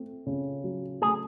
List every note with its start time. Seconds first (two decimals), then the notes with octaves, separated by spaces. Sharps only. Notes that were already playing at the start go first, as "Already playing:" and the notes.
Already playing: A3 C4
0.26 C#3
0.64 F#3
1.02 A3 G#4